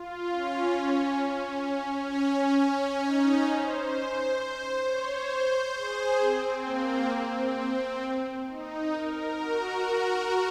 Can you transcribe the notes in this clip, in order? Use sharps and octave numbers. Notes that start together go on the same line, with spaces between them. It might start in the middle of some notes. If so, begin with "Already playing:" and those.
Already playing: F4
C#4
C#4
C#4
C#4
D#4
C5
C#5
C5
G#4
C4
A#3
C4
C4
D#4
A#4
F#4